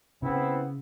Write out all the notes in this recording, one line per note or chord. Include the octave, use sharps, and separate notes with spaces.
C#3 B3 C4 E4